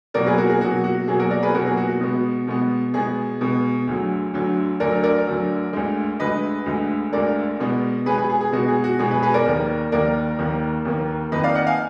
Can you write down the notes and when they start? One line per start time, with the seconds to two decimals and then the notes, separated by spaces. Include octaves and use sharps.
0.14 B2 F#3 A#3 A#4 D5
0.26 G#4 B4
0.38 F#4 A#4
0.50 G#4
0.61 B2 F#3 A#3 F#4
0.84 F#4
1.08 B2 F#3 A#3 G#4
1.19 F#4 A#4
1.31 A#4 D5
1.43 G#4 B4
1.54 B2 F#3 A#3 F#4 A#4
1.66 G#4
1.77 F#4
1.89 F#4
2.01 B2 G#3 B3
2.47 B2 G#3 B3
2.94 B2 G#3 B3 G#4
3.41 B2 G#3 B3
3.87 D2 D3 F#3
4.34 D2 D3 F#3
4.80 D2 D3 F#3 A#4 D5
5.03 A#4 D5
5.27 D2 D3 F#3
5.73 D2 D3 G#3
6.20 D2 D3 G#3 B4 D#5
6.66 D2 D3 G#3
7.13 D2 D3 G#3 A#4 D5
7.60 B2 G#3 B3
8.06 B2 G#3 B3 G#4 B4
8.18 G#4 B4
8.30 G#4
8.41 G#4
8.52 B2 G#3 B3 F#4
8.68 G#4
8.84 F#4
8.99 B2 G#3 B3 G#4
9.11 G#4 B4
9.23 G#4 B4
9.34 A#4 D5
9.46 D#2 D#3 A#3
9.92 D#2 D#3 A#3 A#4 D5
10.39 D#2 D#3 A#3
10.85 D#2 D#3 A#3
11.32 F2 D#3 A#3 B4 D#5
11.43 D5 F5
11.55 D#5 F#5
11.67 F5 G#5